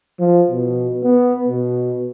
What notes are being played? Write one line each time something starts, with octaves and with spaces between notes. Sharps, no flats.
F3
B2
B3
B2